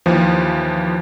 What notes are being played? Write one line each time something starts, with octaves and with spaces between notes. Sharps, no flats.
D#2 E3 F3